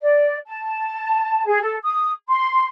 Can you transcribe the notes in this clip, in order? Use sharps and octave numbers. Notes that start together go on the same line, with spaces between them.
D5
A5
G#4
A4
D#6
C6